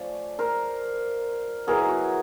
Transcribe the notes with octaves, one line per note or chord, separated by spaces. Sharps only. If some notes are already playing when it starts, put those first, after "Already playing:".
Already playing: F3 A3 C#4 F4 C5 D5
A#4 C5
F#3 B3 E4 G#4 A#4
F#4